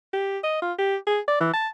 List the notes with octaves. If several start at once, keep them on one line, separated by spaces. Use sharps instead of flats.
G4
D#5
F4
G4
G#4
D5
E3
A5